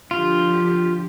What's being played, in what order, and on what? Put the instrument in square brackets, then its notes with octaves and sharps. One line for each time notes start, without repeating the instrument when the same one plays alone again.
[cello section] D3 F3 G4 [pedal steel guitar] F4